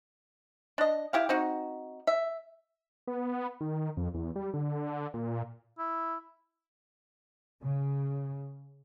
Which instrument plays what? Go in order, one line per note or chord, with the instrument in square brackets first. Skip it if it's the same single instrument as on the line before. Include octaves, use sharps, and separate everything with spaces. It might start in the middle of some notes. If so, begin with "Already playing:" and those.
[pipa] D4 D#5
E4 G4 F5
C4 D#4 F#4
E5
[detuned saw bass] B3
D#3
F2
E2
G3
D3
A#2
[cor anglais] E4
[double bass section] C#3